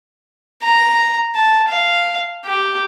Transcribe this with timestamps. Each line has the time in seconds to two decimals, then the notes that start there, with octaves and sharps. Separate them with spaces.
0.63 A#5
1.35 A5
1.68 F5
2.45 G4